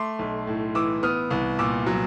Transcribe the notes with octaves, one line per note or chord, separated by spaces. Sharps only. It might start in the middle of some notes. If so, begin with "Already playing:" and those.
Already playing: A3 C6 D6
B1
A2
E3 D6 E6
B3 D#6 F6
C2
A#2 D6 E6
F#3